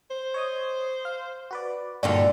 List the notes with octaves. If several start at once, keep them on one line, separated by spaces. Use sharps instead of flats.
C5
C#5 D#5 D#6
F5
F#4 B4 D5
G2 A#2 D3 D#4 F4 F#4 D5